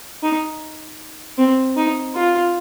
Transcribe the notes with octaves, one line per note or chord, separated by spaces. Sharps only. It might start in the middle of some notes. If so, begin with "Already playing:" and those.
D#4
C4
D#4
F4